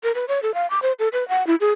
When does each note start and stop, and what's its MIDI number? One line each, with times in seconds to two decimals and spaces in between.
0.03 0.12 70
0.15 0.25 71
0.28 0.39 73
0.43 0.54 69
0.54 0.69 77
0.70 0.79 86
0.82 0.93 72
0.99 1.08 69
1.13 1.27 71
1.29 1.46 78
1.47 1.55 64
1.61 1.72 68